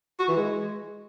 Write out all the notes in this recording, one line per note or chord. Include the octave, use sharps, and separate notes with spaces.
F#4
E3
G#3